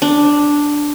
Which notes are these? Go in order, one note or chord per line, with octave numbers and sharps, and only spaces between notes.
D4